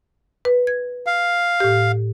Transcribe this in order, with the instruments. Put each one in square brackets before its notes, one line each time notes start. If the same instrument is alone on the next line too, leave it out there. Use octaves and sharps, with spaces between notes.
[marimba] B4
G#6
[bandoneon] F5
[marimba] A2 G4